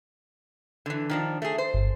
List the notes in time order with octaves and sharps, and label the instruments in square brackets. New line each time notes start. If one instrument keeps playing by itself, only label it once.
[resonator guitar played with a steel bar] D3 E3
D#3 F3 D4
A3 G#4
C5
[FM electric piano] G1